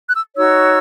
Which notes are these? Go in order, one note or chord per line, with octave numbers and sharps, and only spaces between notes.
F#6
E6
D#4 F#4 C#5 E6